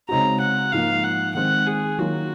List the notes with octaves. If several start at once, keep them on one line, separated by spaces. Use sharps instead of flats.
C#3 G#3 C4 D#4 F#4 A#5
F#5
G#2 F3 A#3 F5
F#5
D#3 G#3 C4 F#5
G#4
D#3 F#3 A#3 F4 F#4